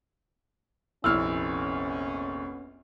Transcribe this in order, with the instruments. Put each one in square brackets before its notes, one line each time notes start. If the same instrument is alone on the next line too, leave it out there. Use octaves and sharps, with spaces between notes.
[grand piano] F1 A#1 F6 [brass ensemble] B3 C#4 [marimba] E4 [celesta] E6